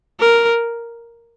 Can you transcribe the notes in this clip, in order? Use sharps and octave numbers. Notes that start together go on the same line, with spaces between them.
A#4